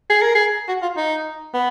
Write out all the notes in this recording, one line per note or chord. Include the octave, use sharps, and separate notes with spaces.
G#4
A#4
G#4
F#4
F4
D#4
B3